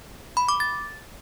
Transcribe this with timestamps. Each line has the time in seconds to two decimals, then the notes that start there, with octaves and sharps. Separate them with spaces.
0.37 B5
0.49 D6
0.60 A6